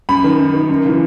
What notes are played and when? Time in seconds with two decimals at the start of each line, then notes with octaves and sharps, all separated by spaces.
0.09 F#2 B5
0.24 D#3
0.39 F#2
0.54 D#3
0.69 F#2
0.85 C#3 E3